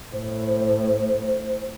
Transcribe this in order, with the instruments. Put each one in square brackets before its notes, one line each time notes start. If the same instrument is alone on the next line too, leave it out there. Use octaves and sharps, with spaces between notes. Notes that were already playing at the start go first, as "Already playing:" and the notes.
[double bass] A2 [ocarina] C5